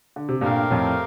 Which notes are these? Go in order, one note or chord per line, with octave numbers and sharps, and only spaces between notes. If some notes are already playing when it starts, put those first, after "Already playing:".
D3
C3
G2 A#2 A3 C4 G4 A#4 F5
F2 A2